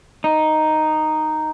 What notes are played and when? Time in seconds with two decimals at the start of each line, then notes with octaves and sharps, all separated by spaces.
0.24 D#4